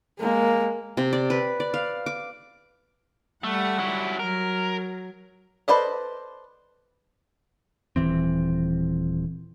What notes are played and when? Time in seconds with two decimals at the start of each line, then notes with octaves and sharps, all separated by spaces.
0.20 G#3 A#3
0.97 C3
1.13 D5
1.30 B4
1.60 D5
1.74 F5
2.06 D6
3.44 G3 A3 F#5
3.79 F#3 E4
4.20 F#3 A#4
5.68 A4 B4 C5 D5 D#5
7.96 D#1 F2 E3 C4